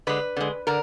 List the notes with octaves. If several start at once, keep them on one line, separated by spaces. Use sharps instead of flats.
D3 G#3 B4
D3 G#3
D3 A#4